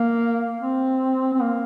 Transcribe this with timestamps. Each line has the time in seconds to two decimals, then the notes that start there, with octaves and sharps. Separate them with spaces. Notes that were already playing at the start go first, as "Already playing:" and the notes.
Already playing: A#3
0.60 C4
1.34 C4
1.41 A#3